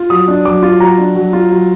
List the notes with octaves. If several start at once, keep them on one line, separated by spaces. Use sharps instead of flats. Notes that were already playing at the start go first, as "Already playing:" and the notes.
Already playing: F4
F#3 D#6
D4
F#3 D6
F4
F#3 A#5
D4
F#3
F4
F#3